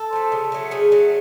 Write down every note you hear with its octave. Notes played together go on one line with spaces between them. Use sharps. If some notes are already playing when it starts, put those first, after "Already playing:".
Already playing: A4
F3 A3
C#3
F#3 A3
C#3 G#4
F#3 A3